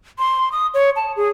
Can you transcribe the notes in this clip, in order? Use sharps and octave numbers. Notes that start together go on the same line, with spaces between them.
C6
D#6
C#5
A5
G#4